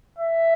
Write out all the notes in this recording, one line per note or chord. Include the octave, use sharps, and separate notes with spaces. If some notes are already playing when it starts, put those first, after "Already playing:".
E5